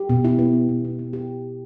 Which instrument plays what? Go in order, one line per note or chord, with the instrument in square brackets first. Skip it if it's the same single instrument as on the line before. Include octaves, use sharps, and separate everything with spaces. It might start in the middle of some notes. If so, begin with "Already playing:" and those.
Already playing: [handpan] G4
B2
E4
B3
G4
B2
E4
B3
G4